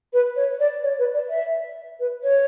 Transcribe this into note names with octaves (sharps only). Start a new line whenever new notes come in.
B4
C#5
D5
C#5
B4
D5
E5
B4
C#5